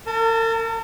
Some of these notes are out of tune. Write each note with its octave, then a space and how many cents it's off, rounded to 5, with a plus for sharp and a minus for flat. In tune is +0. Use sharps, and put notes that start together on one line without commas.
A#4 -45 A5 -15